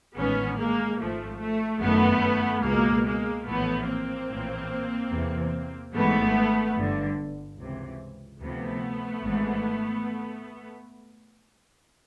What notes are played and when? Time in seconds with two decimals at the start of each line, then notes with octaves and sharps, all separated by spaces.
0.15 A1 G#2 D#3 B3 C#4
0.56 G#3 A#3
0.98 G#1 G#2 F3 A3
1.39 A3
1.80 G1 F#2 D#3 A3 B3
2.63 C#2 B2 G#3 A#3
3.05 G#3 A#3
3.46 A#1 A2 E3 A3 B3
3.87 A#3 C4
4.29 A#1 A2 E3
5.11 E2 C3 E3
5.93 G#1 G#2 E3 A3 B3
6.77 G1 G2 D3
7.58 C#2 C3 E3
8.41 D2 C3 F3 A3 B3
9.24 G#1 G#2 E3